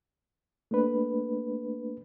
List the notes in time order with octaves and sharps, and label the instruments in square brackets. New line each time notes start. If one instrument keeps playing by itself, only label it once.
[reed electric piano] A3 A#3 D4 B4